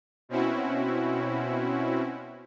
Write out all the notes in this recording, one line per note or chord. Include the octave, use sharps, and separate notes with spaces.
B2 C4 C#4 E4 F#4